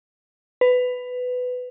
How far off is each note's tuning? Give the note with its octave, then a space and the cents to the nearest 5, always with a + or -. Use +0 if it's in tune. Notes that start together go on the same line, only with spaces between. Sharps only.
B4 +15